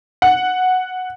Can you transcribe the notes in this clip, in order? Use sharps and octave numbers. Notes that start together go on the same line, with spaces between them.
F#5